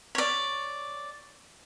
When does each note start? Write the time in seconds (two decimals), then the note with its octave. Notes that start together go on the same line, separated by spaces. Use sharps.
0.15 C#5 D5